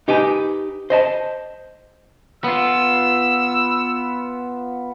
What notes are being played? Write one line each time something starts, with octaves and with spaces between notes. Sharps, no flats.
D#4 G4 B4 G#5
C5 D#5 A5
B3 F4 E6